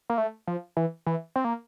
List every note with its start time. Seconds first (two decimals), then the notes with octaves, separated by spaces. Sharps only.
0.10 A#3
0.18 A3
0.48 F3
0.77 E3
1.07 E3
1.36 C4
1.44 A#3